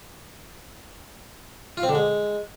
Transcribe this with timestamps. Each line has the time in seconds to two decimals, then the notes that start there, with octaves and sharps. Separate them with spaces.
1.77 F4
1.83 C4
1.89 D3
1.95 G#3